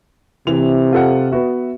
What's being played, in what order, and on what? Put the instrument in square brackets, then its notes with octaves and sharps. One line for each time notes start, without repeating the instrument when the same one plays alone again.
[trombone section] C3 [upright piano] E3 F7
[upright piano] F4 A4 F#5
B3 F#4 E5